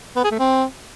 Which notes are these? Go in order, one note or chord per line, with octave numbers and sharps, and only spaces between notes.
B3
G#4
A3
C4